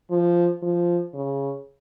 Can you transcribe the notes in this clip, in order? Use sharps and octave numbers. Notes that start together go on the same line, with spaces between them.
F3
F3
C#3